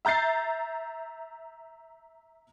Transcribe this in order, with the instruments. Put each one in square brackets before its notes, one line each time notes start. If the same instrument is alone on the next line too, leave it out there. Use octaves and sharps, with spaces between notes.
[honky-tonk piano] E5 A#5 G6 A6 C7